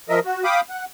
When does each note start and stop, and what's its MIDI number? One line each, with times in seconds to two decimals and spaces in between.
0.09 0.20 53
0.09 0.20 70
0.09 0.20 75
0.09 0.20 76
0.25 0.44 66
0.44 0.61 77
0.44 0.61 79
0.44 0.61 83
0.44 0.61 86
0.44 0.61 87
0.70 0.85 78